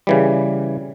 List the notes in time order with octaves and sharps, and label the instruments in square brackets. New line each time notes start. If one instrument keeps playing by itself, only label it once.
[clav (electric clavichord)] C#3 E3 G3